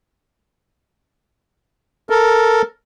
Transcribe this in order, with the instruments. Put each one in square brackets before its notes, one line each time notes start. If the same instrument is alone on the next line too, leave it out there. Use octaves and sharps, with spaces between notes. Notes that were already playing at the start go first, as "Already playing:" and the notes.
[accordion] A4 A#4